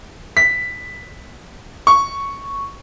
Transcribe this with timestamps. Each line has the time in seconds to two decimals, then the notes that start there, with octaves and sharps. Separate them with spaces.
0.37 B6
1.87 C#6